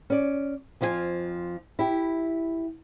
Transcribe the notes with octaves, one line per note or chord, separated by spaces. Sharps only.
C#4 D5
F2 F3 F4 G#4 G#5
E4 G4